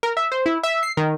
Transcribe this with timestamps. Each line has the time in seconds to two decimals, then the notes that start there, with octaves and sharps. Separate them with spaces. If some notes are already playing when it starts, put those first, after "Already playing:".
0.03 A#4
0.17 E5
0.32 C5
0.46 E4
0.63 E5
0.83 C7
0.97 D#3